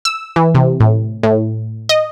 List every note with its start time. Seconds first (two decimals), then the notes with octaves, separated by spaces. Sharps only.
0.05 E6
0.36 E3
0.55 C3
0.80 A2
1.23 A2
1.89 D#5